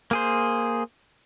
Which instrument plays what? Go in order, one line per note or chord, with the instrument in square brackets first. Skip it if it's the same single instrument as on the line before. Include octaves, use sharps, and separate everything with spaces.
[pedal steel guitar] A#3 G#4 C5